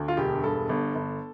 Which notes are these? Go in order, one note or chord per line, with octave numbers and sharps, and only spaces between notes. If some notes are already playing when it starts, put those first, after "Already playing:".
Already playing: D2
F4
E1 G4
G2 A4
G1
G1